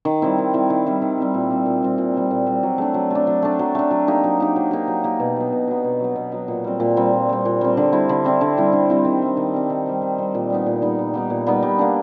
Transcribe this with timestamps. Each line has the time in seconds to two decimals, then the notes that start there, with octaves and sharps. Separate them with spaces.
0.05 D#3
0.22 G3 C4 E4
0.38 D#3
0.54 G3 C4 E4
0.70 D#3
0.86 G3 C4 E4
1.02 D#3
1.17 G3 C4 E4
1.34 A#2
1.51 G3 C4
1.66 A#2
1.83 G3 C4
1.98 A#2
2.14 G3 C4
2.31 A#2
2.47 G3 C4
2.63 F#3
2.78 A3 D4
2.94 F#3
3.10 A3 D4
3.27 F#3
3.42 A3 D4
3.59 F#3
3.75 A3 D4
3.91 F#3
4.08 A#3 D#4 G4
4.24 F#3
4.40 A#3 D#4 G4
4.56 F#3
4.71 A#3 D#4 G4
4.88 F#3
5.04 A#3 D#4 G4
5.20 B2
5.36 F#3 B3
5.52 B2
5.68 F#3 B3
5.84 B2
6.00 F#3 B3
6.16 B2
6.32 F#3 B3
6.48 A#2
6.64 G3 C4
6.80 A#2
6.97 G3 C4
7.13 A#2
7.29 G3 C4
7.45 A#2
7.61 G3 C4
7.77 D3
7.92 G3 C4 E4
8.09 D3
8.24 G3 C4 E4
8.41 D3
8.57 G3 C4 E4
8.73 D3
8.89 G3 C4 E4
9.05 D#3
9.22 G3 C4
9.37 D#3
9.54 G3 C4
9.70 D#3
9.86 G3 C4
10.02 D#3
10.18 G3 C4
10.35 A#2
10.50 G3 B3 D#4
10.66 A#2
10.82 G3 B3 D#4
10.99 A#2
11.14 G3 B3 D#4
11.30 A#2
11.47 G3 B3 D#4
11.63 G3
11.79 A#3 D4